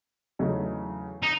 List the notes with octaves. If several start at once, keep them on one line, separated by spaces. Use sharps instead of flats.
E2 C#3 F#3 A3 D#4
D#4